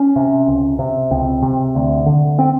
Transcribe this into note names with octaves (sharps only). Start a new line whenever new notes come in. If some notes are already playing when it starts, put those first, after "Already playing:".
Already playing: C#4
C3
C#2
C3
C#2 C4
C3
D2
D3
C4